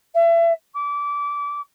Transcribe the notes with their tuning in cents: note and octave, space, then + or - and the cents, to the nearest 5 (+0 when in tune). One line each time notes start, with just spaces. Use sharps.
E5 +35
D6 -25